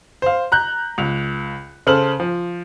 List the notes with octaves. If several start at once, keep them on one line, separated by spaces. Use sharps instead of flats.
C5 F5
A#5 F#6 G6
C#2 F7
C#3 A4 C5 F6 F#7
F3